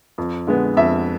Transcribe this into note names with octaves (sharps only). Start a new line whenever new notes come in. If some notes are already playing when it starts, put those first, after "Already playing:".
F2
D3 G#3 B3
F2 E5